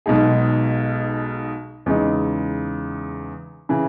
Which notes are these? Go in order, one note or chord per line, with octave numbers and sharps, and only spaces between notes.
B1 B2 G#3 D#4 G#4
E2 C#3 G#3 D#4
C#3 E3